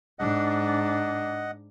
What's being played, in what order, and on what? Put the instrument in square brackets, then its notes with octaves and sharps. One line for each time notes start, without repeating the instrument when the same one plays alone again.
[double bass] G#2 D4 [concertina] D#5 F#5